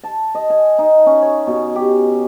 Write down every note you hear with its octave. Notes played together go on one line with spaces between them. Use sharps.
A5
D#5
G#5
D#4
C#4
C#5
B2
G4